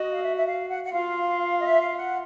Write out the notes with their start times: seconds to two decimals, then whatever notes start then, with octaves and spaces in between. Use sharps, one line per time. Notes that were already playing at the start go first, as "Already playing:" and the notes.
Already playing: F#4 D#5
0.13 F5
0.23 E5
0.36 E5
0.46 F5
0.69 F#5
0.83 F#5
0.93 F4 F5
1.58 D#5
1.64 E5
1.81 F5
1.98 F#5